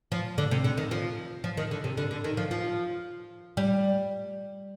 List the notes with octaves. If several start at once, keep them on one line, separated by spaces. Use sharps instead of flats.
F3
D3
C3
D3
D#3
F3
F3
D#3
D3
C3
D3
D3
D#3
F3
F3
G3